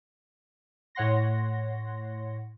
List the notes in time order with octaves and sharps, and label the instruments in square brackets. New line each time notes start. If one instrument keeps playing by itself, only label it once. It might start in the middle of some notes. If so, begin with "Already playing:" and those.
[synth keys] A2 C#5 F#5 C6 A#6